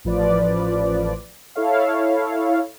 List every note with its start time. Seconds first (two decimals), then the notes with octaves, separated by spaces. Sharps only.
0.05 A1 F3 B4 D5
1.55 E4 A4 C#5 F5